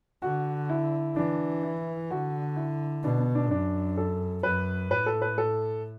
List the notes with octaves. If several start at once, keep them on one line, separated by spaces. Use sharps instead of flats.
D3 F#4
E4
E3 D4
E4
D3 F#4
E4
B2 D4
B3
D4
F#2 D4
A4
F#2 B4
A2 B4
A4
B4
A4